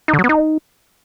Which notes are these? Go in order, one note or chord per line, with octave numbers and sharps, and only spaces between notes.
D#4
D3
F#3
B3
D#4